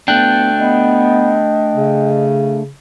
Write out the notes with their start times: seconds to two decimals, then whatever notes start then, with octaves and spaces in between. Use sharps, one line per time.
0.08 A3 B3 D4 G5 F#6 G6
0.58 B3 D#5
1.75 C#3